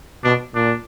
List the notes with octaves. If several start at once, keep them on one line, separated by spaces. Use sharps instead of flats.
B2 D4
A#2 D4